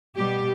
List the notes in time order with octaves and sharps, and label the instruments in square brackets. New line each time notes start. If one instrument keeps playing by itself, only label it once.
[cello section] B2 G3 G4